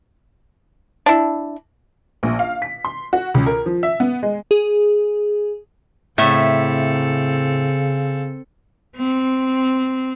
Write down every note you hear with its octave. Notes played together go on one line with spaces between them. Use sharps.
D4 E4
A#1
F5
B6
C6
F#4
C#2
A#4
F3
E5
B3
G#3
G#4
A2 C#3 C4 A4 E5
C4